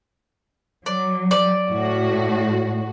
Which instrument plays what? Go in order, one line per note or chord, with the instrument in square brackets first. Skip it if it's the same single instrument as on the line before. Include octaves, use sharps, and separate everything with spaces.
[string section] F#3 [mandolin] D5
[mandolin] D5
[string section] A2 F#4